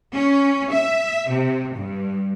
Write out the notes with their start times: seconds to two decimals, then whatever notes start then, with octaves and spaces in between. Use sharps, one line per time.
0.12 C#4
0.70 E5
1.29 C3
1.74 G2